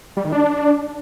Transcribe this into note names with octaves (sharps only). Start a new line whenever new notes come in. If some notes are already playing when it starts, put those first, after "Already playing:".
G3
D#3
D4